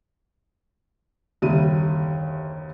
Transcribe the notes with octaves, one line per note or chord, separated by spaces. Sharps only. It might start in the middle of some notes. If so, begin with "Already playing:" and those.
F#1 D#2 D3 G3 E5 D#7